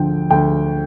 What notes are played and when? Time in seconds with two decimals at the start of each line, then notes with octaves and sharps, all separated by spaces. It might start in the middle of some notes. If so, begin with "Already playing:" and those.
Already playing: D2 D3 F3 G5
0.31 D2 G5